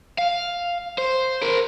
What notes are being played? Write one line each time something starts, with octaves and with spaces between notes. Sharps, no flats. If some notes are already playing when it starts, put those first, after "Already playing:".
F5
C5
A#4 C5